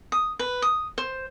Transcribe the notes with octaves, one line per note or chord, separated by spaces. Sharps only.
D#6
B4
D#6
C5